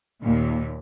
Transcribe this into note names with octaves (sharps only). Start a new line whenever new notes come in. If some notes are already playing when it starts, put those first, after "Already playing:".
D#2 A#2